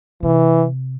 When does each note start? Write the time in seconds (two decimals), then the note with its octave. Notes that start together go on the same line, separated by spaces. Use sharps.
0.23 C3 E3